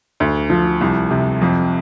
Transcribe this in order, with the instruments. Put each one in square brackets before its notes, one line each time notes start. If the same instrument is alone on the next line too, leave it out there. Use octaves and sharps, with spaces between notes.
[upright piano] D2
F3
C2
C3
F2